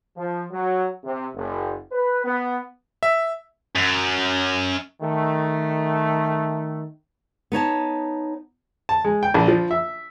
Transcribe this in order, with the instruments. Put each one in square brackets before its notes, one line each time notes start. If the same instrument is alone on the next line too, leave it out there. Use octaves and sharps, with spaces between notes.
[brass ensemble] F3
F#3
C3
F#1
B4
B3
[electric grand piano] E5
[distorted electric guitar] F#2
[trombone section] D#3 A3
[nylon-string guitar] B3 D#4 C#5 A5
[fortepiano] A5
G#3
G5
A#1
F3
E5